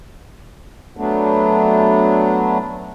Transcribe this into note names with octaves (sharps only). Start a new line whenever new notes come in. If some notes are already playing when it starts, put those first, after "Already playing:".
F#3 A3 B3 D4